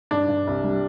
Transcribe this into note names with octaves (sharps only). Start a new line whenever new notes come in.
G2 D4
G2
C2
G3